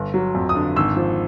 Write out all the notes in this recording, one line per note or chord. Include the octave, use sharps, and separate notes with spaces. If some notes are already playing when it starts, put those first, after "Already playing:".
Already playing: G1
F#3
F2
D#6
D3
G#1 E6
F3